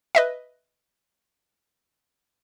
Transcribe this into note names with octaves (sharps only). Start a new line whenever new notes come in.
B4 D#5 E5